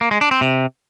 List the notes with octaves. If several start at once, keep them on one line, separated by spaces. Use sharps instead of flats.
A#3
G#3
D4
C4
C3